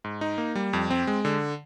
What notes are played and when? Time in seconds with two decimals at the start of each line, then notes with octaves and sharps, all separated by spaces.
0.04 G#2
0.21 D#4
0.38 A#3
0.55 G3
0.73 F2
0.90 C4
1.07 G#3
1.25 D3